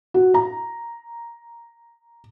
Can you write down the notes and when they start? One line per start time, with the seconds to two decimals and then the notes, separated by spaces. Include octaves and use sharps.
0.14 F#4
0.34 A#5